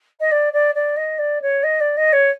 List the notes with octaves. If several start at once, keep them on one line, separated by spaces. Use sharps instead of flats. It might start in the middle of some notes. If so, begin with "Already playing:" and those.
D#5
D5
D5
D5
D#5
D5
C#5
D#5
D5
D#5
C#5